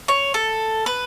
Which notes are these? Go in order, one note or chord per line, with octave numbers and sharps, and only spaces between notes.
C#5
A4
B4